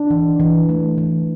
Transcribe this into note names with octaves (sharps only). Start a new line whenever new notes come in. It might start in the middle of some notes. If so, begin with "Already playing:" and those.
Already playing: D4
E3
E3
A3
E3